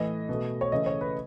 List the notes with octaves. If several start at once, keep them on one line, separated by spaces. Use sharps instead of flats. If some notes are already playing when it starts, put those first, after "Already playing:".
Already playing: A2 E3 A3 D#5
B2 A3
C#5
C#3 E3 A3 D#5
C#5
B4